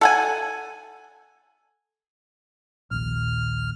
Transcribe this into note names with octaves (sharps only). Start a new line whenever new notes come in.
A4 F#5 G#5
A#1 D#2 F6